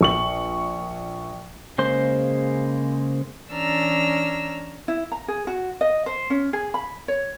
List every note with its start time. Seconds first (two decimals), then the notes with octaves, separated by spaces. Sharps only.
0.01 A#1 C#6 F#7
1.78 C#3 G#3 A#3 C5 C6
3.50 E3 C#4 D4 A#5 E6 F6
4.88 E4
5.12 A#5
5.28 G#4
5.47 F#4
5.81 D#5
6.06 C5
6.30 C#4
6.53 G#4
6.74 B5
7.08 C#5